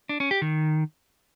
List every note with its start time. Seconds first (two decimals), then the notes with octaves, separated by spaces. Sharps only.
0.09 D4
0.20 C#4
0.31 G4
0.42 D#3